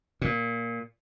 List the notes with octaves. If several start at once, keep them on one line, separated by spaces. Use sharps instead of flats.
A#2